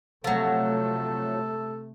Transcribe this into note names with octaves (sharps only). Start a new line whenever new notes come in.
C3 F3 F#3 A3 A4